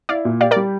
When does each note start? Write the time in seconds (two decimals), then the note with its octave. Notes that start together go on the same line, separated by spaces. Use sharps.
0.09 E4 D5 F5
0.25 A#2
0.41 G4 D5 F5
0.51 A#4 D5
0.56 G3